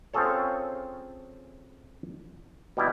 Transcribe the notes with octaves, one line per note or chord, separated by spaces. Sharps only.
C4 C#4 F4 G#4 A4 C#5
B2 G3 E4